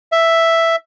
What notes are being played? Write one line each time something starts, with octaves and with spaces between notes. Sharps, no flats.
E5